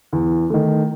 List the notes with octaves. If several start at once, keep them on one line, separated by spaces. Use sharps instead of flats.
E2
D#3 A3